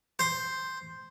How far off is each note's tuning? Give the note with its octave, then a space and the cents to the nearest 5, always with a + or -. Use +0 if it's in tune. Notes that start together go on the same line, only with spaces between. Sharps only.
C5 +0